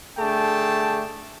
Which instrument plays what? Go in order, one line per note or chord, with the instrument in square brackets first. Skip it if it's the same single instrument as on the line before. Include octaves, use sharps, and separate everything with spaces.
[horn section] D3 A3 G#4 D5 G5 A5